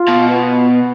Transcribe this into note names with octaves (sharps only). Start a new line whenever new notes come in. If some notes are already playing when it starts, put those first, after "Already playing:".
Already playing: F4
B2
B3